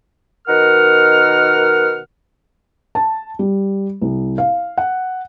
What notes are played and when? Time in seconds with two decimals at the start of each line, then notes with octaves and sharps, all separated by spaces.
0.47 B2 D#3 A#4 F#5 F6
2.95 A5
3.39 G3
4.02 C2
4.38 F5
4.78 F#5